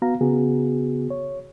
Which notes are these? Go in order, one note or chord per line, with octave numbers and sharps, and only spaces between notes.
B3 F#4 F5 A#5
C#3 B3 F#4 G#4
C#5